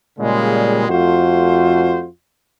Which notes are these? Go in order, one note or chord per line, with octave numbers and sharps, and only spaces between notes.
A#2 C#3 G3 G#3
F2 A3 F4 F#4 C5